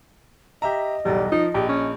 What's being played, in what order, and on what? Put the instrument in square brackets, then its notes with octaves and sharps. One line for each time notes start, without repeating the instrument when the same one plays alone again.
[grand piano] G4 E5 A#5 [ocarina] D#5
[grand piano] B1 E2 [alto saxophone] G3
[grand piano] F3 [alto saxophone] D#4
[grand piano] A#1 [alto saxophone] G4
[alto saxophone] C#4